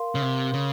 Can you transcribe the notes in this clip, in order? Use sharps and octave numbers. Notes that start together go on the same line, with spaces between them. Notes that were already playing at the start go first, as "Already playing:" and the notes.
Already playing: A#4 F5 C6
C#3
C3
C#3